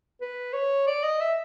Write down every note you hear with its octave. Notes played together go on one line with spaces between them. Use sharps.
B4
C#5
D5
D#5
E5